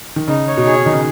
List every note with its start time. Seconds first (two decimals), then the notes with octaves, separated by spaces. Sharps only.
0.16 D#3
0.28 C#3 D#4
0.48 C#5
0.57 B2
0.66 G#4
0.85 D#3 D#4
0.92 C#3